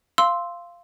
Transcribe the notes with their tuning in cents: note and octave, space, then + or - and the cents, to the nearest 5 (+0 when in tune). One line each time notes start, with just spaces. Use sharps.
F5 -10 C6 +0 E6 -5